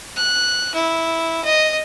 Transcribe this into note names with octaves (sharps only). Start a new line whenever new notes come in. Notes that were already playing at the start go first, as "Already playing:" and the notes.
F#6
E4
D#5